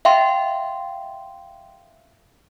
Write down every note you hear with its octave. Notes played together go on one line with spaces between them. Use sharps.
E5 F5 G5 C6